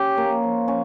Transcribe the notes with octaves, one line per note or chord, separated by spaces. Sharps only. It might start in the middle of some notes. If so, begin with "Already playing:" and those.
Already playing: C#4 G4
A#3
F3
C#4